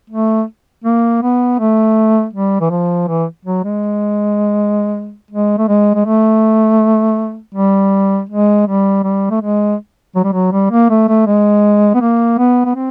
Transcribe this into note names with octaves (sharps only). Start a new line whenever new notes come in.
A3
A#3
B3
A3
G3
E3
F3
E3
F#3
G#3
G#3
A3
G#3
G#3
A3
G3
G#3
G3
G3
A3
G#3
F#3
G3
F#3
G3
A#3
A3
A3
G#3
B3
A#3
B3
B3
C4